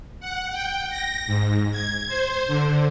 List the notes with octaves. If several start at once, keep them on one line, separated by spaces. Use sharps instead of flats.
F#5
G5
A#6
G#2
G#6
C5
D3